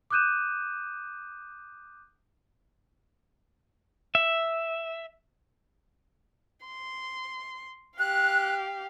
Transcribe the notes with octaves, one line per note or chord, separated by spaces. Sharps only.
D6 D#6 F#6 G6 D#7 E7
E5
C6
G4 F5 F#6